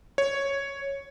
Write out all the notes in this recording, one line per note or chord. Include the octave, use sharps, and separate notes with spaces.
C#5